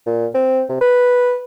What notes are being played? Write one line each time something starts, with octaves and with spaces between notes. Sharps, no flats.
A#2
C4
C3
B4